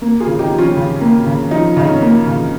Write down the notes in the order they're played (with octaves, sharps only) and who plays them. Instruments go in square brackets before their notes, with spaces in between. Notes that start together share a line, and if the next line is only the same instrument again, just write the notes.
[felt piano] A#3
F4 G#4
C#3
D#4 G4
F3
C#4 F4
C#3
A#3
C#3
F3 D#4
C#3 D#4
C#4
A#3
C#3